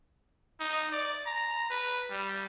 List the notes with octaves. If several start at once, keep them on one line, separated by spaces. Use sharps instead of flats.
D#4
D5
A#5
B4
G3